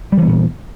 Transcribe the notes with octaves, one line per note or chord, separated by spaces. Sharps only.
A#2 E3 G3 B3